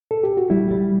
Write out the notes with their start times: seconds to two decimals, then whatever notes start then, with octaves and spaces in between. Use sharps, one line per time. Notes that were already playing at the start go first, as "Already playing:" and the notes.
0.11 A4
0.24 G4
0.37 F#4
0.50 G3 E4
0.71 G3